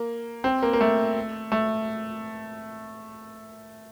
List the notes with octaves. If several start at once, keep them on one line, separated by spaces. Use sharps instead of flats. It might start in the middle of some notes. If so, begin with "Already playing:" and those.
Already playing: A#3
C4
A#3
A#3
A3
A3